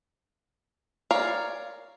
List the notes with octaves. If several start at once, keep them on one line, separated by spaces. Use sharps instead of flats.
A#4 C#5 D5 F5